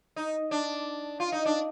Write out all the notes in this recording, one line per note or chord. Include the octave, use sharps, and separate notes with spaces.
D#4
D4
F4
D#4
D4